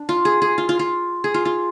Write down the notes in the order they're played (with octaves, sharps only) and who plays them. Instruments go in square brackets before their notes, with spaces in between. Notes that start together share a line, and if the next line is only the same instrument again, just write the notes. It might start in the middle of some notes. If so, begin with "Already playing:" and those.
Already playing: [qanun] D4
F4
G#4
G#4
F4
F4
F4
G#4
F4
F4